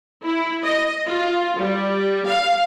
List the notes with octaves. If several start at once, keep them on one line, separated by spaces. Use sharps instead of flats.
E4
D#5
F4
G3
F5